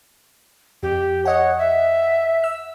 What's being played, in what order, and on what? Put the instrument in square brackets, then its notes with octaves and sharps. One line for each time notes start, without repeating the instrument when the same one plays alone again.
[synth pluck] F2 [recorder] G4
[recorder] C#5 [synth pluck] D#5 F#5
[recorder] E5
[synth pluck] E6